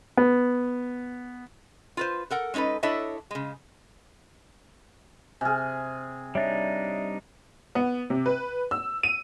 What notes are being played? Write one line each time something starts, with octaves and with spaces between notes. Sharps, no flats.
B3
F4 B4 C5
A4 A#4 F#5
G#3 C#4 D#4 A4 B4
D4 E4 A4 C#5 D#5 E5
C#3 G#3
C3 G#4 G#5 F6
G3 D4 D#4 C#5 E5
B3
C3
B4
E6
D#7